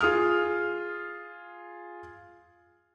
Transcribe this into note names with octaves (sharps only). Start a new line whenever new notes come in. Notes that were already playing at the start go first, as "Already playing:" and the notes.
F4 G#4 D#6 F6